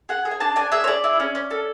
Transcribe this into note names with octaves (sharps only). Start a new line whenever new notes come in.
G#4 F#5
G#4
G#5
D4 A5
D4 G#5
G#4 E5
C#5
G#4 D5
E4
C#4
C#4
A4